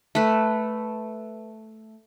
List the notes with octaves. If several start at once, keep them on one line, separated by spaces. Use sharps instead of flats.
A3 B4